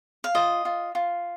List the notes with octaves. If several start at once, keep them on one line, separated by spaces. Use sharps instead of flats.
F5
F4 D#5
F4
F4